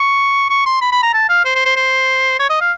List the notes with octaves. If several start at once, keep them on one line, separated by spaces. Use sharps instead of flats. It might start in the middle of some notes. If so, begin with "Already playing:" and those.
Already playing: C#6
C#6
C6
B5
B5
A#5
A5
F5
C5
C5
C5
C5
C#5
D#5
F5